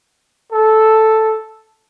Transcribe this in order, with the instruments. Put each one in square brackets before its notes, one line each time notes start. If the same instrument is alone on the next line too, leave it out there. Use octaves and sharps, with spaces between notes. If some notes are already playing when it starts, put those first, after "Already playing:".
[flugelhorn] A4